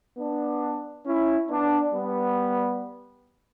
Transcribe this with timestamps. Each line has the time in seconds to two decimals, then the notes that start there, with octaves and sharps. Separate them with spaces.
0.18 B3 D4
1.06 C#4 E4
1.49 B3 D4
1.93 G3 B3